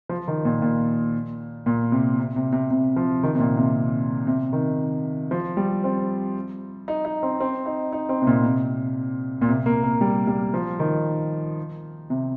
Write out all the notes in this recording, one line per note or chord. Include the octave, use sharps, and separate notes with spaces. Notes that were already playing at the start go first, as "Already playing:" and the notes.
F3
D#3
A#2
A#2
A#2
C3
C3
C3
C3
C3
F3
D#3
C3
A#2
C3
C3
D#3
F3
G3
C4
D#4
D#4
C4
C4
D#4
D#4
C4
C3
A#2
C3
A#2
C3
A#3
A#3
G3
G3
F3
D#3
C3